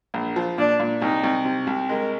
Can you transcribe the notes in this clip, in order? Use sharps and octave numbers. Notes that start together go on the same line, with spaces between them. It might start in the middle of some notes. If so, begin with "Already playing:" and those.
A#1
F3
A#2 D4
A#2
C2 D#4
C2
C3
C2
G#3 A#4